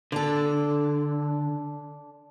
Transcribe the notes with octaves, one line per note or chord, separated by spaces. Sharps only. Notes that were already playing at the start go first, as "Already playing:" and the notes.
D3 D4 A4